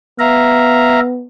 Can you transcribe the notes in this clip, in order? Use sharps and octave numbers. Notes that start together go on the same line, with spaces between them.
B3 E5 F5 A#5